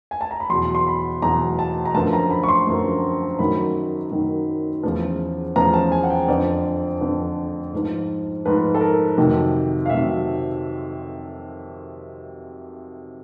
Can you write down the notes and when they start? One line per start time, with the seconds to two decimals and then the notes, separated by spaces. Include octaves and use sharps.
0.11 G#5
0.21 A5
0.31 A#5
0.40 B5
0.50 E2 B2 F#3 C6
0.75 C6
0.87 B5
1.22 E2 B2 F#3 A#5
1.59 A5
1.85 A#5
1.95 F#2 D3 F3 A5
2.13 A#5
2.31 B5
2.43 C#6
2.49 C6
2.67 F#2 D3 F3
3.39 F#2 D#3 F#3 B5
4.11 F#2 D#3 F#3
4.83 E2 C#3 F3
5.56 E2 C#3 F3 A#5
5.74 A5
5.92 G#5
6.03 F#5
6.10 G5
6.28 F2 D3 F3 D5
7.01 F2 D3 F3
7.73 G#2 F3
8.45 G#2 F3 B4
8.75 A4
8.81 A#4
9.17 F2 C3 D#3 F#3
9.86 F5
9.89 C3 D#3 F#3 E5